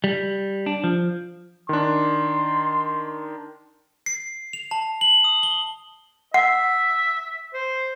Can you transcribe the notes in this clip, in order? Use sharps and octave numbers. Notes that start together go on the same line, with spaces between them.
G3
D4
F3
D#3 D4 C6
C7
F7
A5
F#7
D#6
G7
E5 F#5
C5